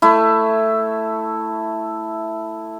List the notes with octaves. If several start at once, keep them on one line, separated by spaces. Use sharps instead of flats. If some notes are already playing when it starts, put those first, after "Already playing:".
A3 E4